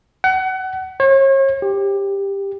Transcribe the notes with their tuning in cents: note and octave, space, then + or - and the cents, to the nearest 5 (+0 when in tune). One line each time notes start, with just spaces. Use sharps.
F#5 +30
C#5 -40
G4 +10